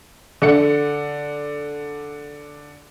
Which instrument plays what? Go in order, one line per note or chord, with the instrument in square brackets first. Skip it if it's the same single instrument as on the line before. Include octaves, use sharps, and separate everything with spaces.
[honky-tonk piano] D3 C#7